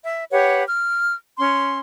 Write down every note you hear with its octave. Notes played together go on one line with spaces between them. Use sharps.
E5
G4 B4 C#5 F#5
F6
C#4 C6